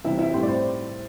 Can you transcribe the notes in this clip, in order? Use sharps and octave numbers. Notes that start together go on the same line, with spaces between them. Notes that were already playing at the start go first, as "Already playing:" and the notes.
C3 E3 G3 E4 E5
E4 E5
A2 G3 C4 C5
D5
C4 C5